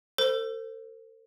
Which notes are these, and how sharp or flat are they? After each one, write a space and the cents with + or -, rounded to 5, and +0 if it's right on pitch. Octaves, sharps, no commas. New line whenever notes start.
A4 +45 C5 +0